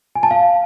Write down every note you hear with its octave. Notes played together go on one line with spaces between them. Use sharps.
G#5
A5
F5